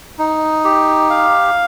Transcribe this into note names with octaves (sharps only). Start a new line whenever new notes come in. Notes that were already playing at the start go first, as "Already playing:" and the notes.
D#4
G4
F5